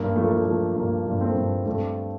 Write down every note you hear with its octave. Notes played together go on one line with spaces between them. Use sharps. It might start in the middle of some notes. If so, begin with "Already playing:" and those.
Already playing: G2 A#3
F3 A3
A#3
A3
F3 A3
G2 A#3
G2
A3 C4
G2
G2 A3 C4